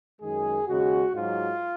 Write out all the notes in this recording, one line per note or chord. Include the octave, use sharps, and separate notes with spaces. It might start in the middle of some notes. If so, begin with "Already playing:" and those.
F#2 D#3 G#3 G#4
D#2 C#3 G#3 F#4
G#2 F#3 F4